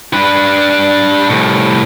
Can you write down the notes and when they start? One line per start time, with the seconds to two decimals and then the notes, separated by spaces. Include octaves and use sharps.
0.13 D4 B4
1.29 C2 A2